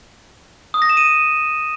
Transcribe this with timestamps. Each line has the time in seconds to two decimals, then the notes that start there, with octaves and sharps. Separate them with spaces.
0.74 D#6
0.82 A#6
0.89 E7
0.97 D#7